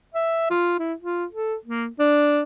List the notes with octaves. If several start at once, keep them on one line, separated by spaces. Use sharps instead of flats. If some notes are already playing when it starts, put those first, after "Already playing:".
E5
F4
E4
F4
A4
A#3
D4